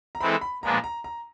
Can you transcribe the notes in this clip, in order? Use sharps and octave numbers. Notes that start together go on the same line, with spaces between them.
A#5
E3 G#3 C4 E4 A4 B5
B5
A#2 F3 G#3 B3 D4 A#5
A#5
A#5